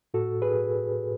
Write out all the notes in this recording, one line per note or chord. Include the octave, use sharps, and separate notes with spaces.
A2 F#4 A4
A2 G#4 B4